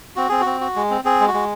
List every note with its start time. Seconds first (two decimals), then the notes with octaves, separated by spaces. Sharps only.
0.16 C4 F#4
0.29 C4 G#4
0.41 F#4
0.46 C4
0.61 F#4
0.76 G#3
0.90 C4
1.05 C4 G#4
1.20 G#3
1.28 F#4
1.34 G#3